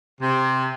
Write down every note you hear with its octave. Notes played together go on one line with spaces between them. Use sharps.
C3